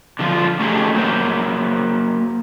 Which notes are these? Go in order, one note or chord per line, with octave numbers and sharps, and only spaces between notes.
D3 F3 F4
A3 C#4 D#4 G4 G#4
F#3 A#3 C5